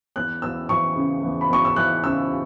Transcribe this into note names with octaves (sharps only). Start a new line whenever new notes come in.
E2 F#6
E2 E6
E3 C#6
C#3
E2
B5
E2 C#6
E6
E3 F#6
C#3 E6